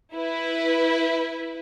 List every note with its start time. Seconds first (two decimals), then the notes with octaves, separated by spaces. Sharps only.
0.15 E4 B4